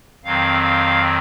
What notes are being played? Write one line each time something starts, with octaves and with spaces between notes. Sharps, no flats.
F2 D#3 F#3 C4 F5
F5